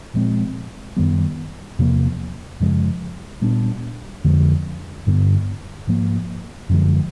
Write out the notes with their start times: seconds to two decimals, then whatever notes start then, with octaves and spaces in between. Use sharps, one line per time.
0.14 A#2 F3 G#3 C4
0.97 F#2 D#3 G3 B3
1.78 E2 C3 F3 A#3
2.60 F#2 C#3 F3 G#3
3.41 A#2 G3 B3 D4
4.24 F2 D3 F3 G#3
5.07 G2 D3 G3 B3
5.87 G#2 F3 A#3
6.69 F#2 D3 F3 G#3